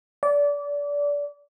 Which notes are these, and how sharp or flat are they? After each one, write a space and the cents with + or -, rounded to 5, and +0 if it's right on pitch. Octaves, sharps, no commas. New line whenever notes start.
D5 -25